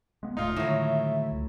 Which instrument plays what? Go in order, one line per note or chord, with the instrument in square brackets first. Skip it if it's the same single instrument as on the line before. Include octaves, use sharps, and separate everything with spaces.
[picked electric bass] G#3 A#3 B3
[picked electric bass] D1 A2 [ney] A3 [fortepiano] D#4 F4
[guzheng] A2 F#3 [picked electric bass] D3 D#3 G#3 [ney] E5
[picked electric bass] C#2